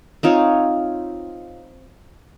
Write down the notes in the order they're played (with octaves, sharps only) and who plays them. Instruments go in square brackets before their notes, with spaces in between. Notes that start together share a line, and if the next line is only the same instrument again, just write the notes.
[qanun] C4 D#4 F4 C#5